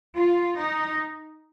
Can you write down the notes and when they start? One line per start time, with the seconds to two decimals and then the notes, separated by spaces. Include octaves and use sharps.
0.15 F4
0.56 D#4